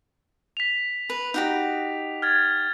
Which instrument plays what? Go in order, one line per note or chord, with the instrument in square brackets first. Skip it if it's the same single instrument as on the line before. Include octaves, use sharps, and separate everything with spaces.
[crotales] B6 F7
[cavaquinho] B4
D#4 F#4 G4
[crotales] F6 G#6 A6